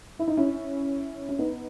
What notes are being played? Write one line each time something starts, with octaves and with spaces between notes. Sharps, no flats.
E4
D#4
C#4 E4
C#4
B3 D#4